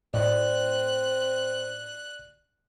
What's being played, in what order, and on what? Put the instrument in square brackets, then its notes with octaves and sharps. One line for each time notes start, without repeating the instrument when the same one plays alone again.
[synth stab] A2 [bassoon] C4 [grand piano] D5 [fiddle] F#6